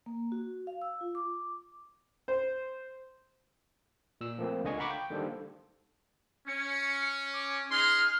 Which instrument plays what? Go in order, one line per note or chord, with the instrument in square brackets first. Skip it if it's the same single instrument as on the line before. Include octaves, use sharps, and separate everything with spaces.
[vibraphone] A#3
F#4
F5
E6
F4
D6
[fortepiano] C5
[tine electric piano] A#2 E6
F3 A3 A#3 C4
C#2 D3 D#5 G#5 C#6
F5 F#5 A#5 B5 C#6 D6
G5
D3 D#3 G3 A#3 A4 C5
[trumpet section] C#4 [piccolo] C#7
[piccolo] D6
[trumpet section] D#4 G#4 C6 [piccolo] F6